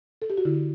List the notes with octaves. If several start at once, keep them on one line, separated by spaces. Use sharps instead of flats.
A4
G4
F#4
D3 E4